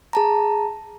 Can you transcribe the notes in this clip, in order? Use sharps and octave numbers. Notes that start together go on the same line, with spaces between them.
G#4 A5 A#5